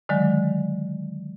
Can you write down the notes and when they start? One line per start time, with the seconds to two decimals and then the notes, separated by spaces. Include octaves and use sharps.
0.09 D3 D#3 F#3 G#3